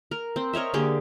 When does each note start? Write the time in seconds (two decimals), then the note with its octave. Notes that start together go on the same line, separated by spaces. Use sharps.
0.11 A#4
0.36 C4
0.53 A#4 C#5 D#5 E5
0.74 D3 A#3 G4 G#4